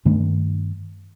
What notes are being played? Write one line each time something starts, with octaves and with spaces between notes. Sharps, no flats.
G2 D#3 A3 D4